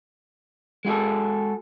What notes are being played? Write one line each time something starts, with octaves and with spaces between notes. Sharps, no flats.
G#3 F#4 G#4 A4